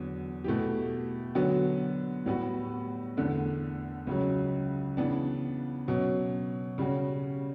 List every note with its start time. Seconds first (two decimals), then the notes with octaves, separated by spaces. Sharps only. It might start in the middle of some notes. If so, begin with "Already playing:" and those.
Already playing: E2 D3 F#3
0.44 B2 A3 E4 G4
1.35 D3 F#3 B3 F#4
2.26 A2 G3 B3 F#4
3.17 E2 D3 A3
4.07 C#2 C#3 F#3
4.97 C#3 E3 B3 D4
5.88 B2 F#3 C#4
6.78 C#3 G3 C#4 F#4